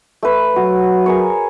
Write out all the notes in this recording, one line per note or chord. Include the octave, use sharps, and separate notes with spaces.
A3 B4
F#3 F#4
G#4 A#4 C#5